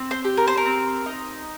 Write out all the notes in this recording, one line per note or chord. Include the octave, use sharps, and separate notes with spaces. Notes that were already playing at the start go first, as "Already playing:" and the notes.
Already playing: C4
C5
G4
A#4
C5
A#4
C4
D#4